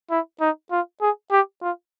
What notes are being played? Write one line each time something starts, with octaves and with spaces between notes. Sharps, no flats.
E4
D#4
F4
G#4
G4
F4